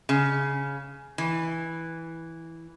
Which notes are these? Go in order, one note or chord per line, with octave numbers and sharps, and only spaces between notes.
C#3
E3